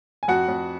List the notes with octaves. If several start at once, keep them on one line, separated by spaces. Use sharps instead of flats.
G#5
F2 F#4 F#5
F2